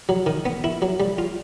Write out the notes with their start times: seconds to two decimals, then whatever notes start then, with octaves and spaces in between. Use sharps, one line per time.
0.09 F#3
0.26 D#3
0.45 B3
0.64 E4
0.82 F#3
1.00 G3
1.18 F4